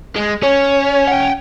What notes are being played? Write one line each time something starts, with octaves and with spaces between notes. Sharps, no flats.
G#3
C#4 C#5
F#5 G5